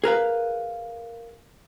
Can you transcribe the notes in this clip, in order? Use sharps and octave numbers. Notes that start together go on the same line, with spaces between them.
G#4 A#4 B4 F5